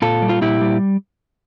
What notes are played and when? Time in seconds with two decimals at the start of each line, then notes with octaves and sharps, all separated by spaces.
0.02 A#2 F4 A4
0.22 G3
0.29 F4
0.41 A#2 E4 G4
0.61 G3